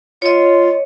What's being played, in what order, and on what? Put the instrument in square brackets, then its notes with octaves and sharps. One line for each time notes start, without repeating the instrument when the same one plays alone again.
[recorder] F4 [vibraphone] C#5 D#5